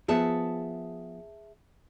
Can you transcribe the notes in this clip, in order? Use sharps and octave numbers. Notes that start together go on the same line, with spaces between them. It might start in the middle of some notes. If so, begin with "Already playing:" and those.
F3 B3 G#4 E5 A5